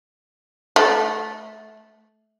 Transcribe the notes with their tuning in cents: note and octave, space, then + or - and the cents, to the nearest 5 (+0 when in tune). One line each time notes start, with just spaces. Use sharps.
A3 -20